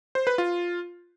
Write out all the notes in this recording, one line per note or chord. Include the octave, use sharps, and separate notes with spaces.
C5
B4
F4